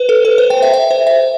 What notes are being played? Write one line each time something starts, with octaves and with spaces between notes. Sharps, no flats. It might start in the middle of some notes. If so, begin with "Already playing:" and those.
Already playing: B4 C5
A4
B4
C5
G5
E5
E5
C5
E5